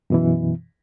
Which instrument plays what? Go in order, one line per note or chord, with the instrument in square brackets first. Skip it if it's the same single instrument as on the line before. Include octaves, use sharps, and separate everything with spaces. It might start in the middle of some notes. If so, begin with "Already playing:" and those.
[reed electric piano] F#2 B2 E3